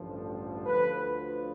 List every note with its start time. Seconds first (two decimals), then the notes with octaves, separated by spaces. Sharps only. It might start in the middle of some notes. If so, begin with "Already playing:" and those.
Already playing: A1 G2 D3 F3
0.64 D2 D3 F3 B4